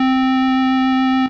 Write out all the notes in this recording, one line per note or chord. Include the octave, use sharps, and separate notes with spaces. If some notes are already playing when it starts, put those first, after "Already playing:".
Already playing: C4